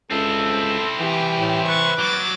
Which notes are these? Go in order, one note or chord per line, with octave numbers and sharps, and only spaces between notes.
C#2 C4 E4 A4
E3 G4
A2
B4 C#6 A6
F#3 G3 D6 A6